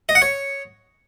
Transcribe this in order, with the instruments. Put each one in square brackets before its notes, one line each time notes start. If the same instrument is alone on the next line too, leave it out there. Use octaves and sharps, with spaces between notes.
[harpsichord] D#5
F#5
C#5